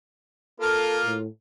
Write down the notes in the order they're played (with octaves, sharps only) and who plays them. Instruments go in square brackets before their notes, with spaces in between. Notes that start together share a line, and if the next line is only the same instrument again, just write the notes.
[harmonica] A#3 F4 [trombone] A4
[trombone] A2